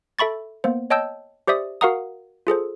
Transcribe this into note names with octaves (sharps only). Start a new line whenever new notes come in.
A4 E5 B5 C#6 A6
A#3 B3 C5
C#5 D#5 G5 A5 E6 G6
G4 C5 D5 E5 D#6
F#4 A#4 F5 F#5 A#5 D#6
F4 G#4 A4 C5